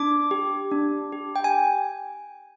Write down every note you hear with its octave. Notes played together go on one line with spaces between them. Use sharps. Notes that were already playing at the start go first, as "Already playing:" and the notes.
Already playing: D4 D6
G4
D4
G4
G5
G#5